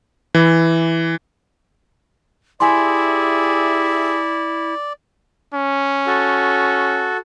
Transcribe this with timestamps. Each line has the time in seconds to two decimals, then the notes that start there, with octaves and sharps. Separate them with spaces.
0.35 E3
2.60 E4 G4 G#4 D5 E5 G#5 C6
5.54 C#4
6.07 F#4 A4